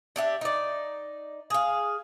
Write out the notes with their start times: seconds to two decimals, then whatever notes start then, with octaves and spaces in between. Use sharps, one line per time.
0.16 D4 G4 E5
0.41 D#4 D5
1.50 G#4 F5